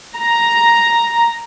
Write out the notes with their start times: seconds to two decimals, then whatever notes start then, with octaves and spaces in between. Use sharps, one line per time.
0.17 A#5